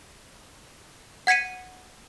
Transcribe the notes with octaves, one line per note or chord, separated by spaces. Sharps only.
F#5 G#6 B6 C#7 D#7